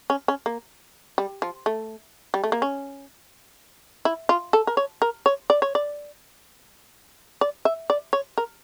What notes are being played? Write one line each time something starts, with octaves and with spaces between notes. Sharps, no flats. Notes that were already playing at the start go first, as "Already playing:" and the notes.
C#4
C#4
A#3
G3
F3
A3
G3
A3
A#3
C#4
E4
F4
A4
A#4
C#5
A#4
C#5
D5
C#5
D5
D5
E5
D5
C#5
A#4